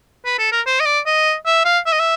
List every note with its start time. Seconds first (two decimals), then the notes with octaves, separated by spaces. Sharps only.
0.25 B4
0.38 A4
0.52 A#4
0.66 C5
0.80 D#5
0.85 D5
1.06 D#5
1.46 E5
1.65 F5
1.86 E5
1.92 D#5
1.99 E5